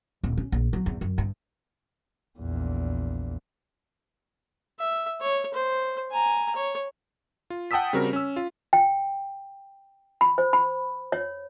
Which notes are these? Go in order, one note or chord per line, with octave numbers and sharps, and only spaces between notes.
D#1
C#4
A#1
F#3
E2
F#2
G2
A#1 E2
E5
C#5
C5
G#5 A#5
C#5
F4
F#5 G5 A5 D#6 E6 B6
C#3 G3 C4 F#4 A#4
C#4 E6
F4
G5
B5
C5
B5
C#5